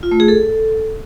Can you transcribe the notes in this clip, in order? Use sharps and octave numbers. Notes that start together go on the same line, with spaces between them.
F4
A3
G#4
A4